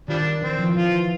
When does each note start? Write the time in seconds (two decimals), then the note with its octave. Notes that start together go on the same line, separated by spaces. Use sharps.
0.08 D#3 F3 G3 D4
0.42 E3 C4
0.59 F3
0.76 E3 F4